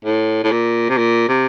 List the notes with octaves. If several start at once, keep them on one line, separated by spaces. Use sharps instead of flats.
A2
A2
A#2
C3
A#2
C3